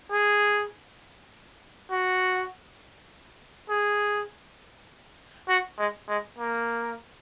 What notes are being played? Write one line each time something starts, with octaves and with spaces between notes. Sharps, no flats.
G#4
F#4
G#4
F#4
G#3
G#3
A#3